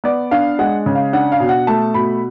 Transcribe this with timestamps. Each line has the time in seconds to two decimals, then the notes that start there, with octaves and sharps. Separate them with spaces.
0.04 B3 D5
0.31 D4 F5
0.59 G#3 F#5
0.86 C#3
0.95 F5
1.13 D4 F#5
1.32 F5
1.40 B2
1.49 F#5
1.67 A3 A5
1.94 B2 B5